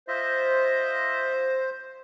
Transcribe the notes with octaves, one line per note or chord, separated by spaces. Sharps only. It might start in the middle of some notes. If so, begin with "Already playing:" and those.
F4 C5 D#5 E5